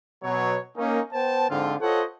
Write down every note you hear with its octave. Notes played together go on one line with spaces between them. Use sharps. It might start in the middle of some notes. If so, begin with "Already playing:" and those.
B2 F#3 C#5
A#3 C#4 D#4
B3 C5 G5 A5
G#2 D3 F3 C4 F4
F4 A4 C5 C#5 D#5 F#5